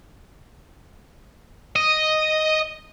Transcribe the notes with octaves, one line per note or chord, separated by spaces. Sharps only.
D#5